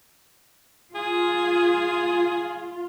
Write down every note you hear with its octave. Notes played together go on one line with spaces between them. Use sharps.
F4 G#4